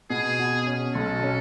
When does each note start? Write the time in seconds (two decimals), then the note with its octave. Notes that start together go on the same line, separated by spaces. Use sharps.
0.10 B2 G#4
0.39 B2
0.67 C#4
0.95 B1 A4
1.23 C#4